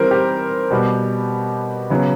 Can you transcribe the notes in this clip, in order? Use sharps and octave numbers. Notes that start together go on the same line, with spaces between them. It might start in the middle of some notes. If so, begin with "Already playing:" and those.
Already playing: E3 G3 C4 A#4 C5
G4
B2 G3 B3
C#3 F#3 B3